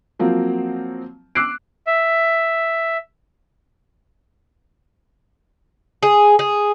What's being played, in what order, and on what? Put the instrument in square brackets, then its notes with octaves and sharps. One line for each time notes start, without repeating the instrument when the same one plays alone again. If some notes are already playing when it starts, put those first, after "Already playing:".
[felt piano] F3 F#3 A#3 C4
D6 E6 F#6 C7 D7
[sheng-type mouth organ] E5
[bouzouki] G#4
G#4